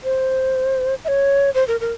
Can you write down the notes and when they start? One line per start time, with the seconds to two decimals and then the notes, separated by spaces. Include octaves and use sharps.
0.04 C5
1.04 E5
1.08 C#5
1.54 C5
1.67 A#4
1.81 A#4